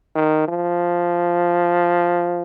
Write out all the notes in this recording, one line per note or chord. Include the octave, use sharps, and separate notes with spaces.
D#3
F3